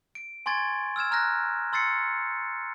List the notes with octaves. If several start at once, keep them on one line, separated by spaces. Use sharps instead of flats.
D7
G#5 C6 C#6 G#6 A6
E6 F6 G#6 E7
A#5 F6 F#6 A#6
C6 E6 A6 C7 C#7